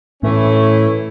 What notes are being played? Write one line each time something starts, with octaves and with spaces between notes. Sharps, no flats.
A2 E3 A3 C#4